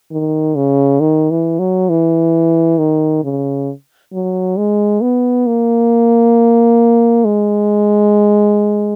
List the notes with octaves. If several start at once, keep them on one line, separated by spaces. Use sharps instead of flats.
D#3
C#3
D#3
E3
F#3
E3
D#3
C#3
F#3
G#3
B3
A#3
G#3